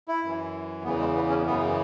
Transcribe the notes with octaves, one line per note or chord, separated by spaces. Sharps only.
E4
F#2 E3
E2 C#3 E3 B3
G#3
B3
C#4
F#2 C#3 E3 B3